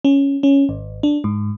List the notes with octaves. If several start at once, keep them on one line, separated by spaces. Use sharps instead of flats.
C#4
C#4
G#1
D4
G#2